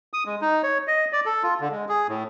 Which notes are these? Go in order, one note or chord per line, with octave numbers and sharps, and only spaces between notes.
D#6
G#3
D#4
C#5
D#5
D5
A4
F4
D3
G#3
G#4
A2